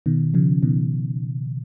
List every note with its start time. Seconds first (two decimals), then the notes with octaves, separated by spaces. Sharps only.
0.06 B2 D#3
0.34 C#3 F3
0.62 B2 D#3